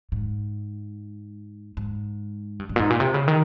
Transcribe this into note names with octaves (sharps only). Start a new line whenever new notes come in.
G#2
G#2
G2
G2
A#2
G#2
A#2
C3
C#3
D#3